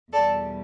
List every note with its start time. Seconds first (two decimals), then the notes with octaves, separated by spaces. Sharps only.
0.12 E2 B2 G3 A4 D5